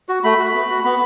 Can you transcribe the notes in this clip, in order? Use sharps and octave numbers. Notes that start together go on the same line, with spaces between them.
F#4
A3 B5
F#4
B3
F#4
B3 B5